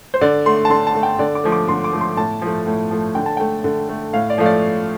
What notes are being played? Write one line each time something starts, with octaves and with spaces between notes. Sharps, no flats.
C5
D3 D5
A3 C6
A5
D3 C6
A5
A3
G5
D3 D5
D6
F3 A3
D6
D3 C6
D6
F3 A3
C6
A2 A5
F3 A3
A2
F3 A3
D3 G5
A5
A3 G5
D3
A3
A2 F5
D5
F3 A3 F5
D5